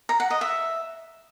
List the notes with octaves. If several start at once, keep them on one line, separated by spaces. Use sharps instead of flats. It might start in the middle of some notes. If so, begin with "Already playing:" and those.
A#5
F#5
D#5
E5